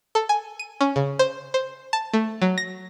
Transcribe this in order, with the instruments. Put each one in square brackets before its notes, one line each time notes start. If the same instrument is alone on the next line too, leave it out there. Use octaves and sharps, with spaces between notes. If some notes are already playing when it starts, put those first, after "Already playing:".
[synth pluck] A4
G#5
D#7
C#4
C#3
C5
C5
A5
A3
F#3
A#6